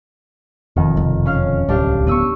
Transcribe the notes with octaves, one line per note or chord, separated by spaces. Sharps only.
E1 F2 D#3
C3
C#4 F5 F6
D1 C2 D4 G4 F5
B3 E4 C#6 E6 D#7